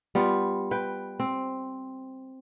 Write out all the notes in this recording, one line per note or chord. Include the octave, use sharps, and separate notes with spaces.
G3 B3 F4
B4 G5
C4